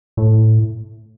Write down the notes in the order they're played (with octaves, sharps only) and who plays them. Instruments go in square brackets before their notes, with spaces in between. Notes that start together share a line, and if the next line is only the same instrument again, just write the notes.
[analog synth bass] A2